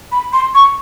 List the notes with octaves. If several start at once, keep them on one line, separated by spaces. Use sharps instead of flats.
B5
C6
C#6